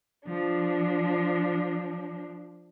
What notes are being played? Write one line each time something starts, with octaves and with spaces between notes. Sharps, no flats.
F3 D4